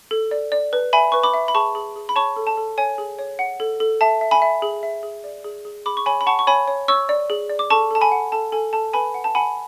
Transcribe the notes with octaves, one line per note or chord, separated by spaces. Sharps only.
A4
D5
D5
B4
E5 G#5 B5
B4 C#6
B5 D6
E5
B5
G#4 A5 C#6
G#4
G#4
B5
C#5 A5 C#6
A4
A5
A4
C#5 G#5
G#4
C#5
F#5
A4
A4
E5 A5
E5
G#5 B5
E5
G#4
E5
G#4
D5
G#4
G#4
G#4 B5 D6
C#6
C#5 G#5 B5
B5
F#5 A5 C#6
C#6
C#5 G#5 B5
C#5
C#5 C#6 E6
D5
G#4
D5
D6
A4 A5 C#6
A4 A5
G#5 B5
F#5
A4 A5
A4 G#5
A4 A5
B4 G#5 B5
F#5
A5
F#5 G#5 B5